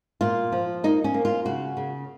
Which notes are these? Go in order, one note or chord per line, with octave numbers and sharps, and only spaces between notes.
A#2 F4
F3
A#3 D#4
C#4
A#3
F4
C#3 F#4
C#3